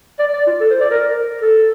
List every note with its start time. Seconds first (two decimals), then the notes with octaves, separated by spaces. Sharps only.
0.19 D5
0.33 D5
0.47 F4
0.60 A4
0.70 C5
0.81 D5
0.91 A#4
1.42 A4